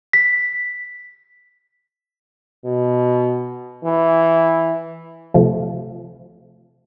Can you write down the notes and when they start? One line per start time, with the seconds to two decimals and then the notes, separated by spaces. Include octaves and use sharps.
0.13 B6
2.65 B2
3.85 E3
5.34 C3 F3 A3